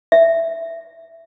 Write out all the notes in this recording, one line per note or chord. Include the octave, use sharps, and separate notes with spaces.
E5